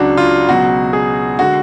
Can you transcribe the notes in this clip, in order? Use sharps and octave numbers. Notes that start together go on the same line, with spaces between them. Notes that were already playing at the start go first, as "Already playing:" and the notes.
Already playing: C#2 C#3 F#3 D4 F#4
F4
C#2 B2 F#3 F#4
G#4
D3 G#3 F#4